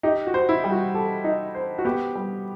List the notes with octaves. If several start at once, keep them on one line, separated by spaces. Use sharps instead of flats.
D#4 G4
F#4
C5
E4
G3
F#4
G4 A4
D#4
C5
F#4
B3 G4
G3